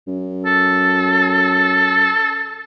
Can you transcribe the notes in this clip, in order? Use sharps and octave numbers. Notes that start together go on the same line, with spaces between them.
F#2
A4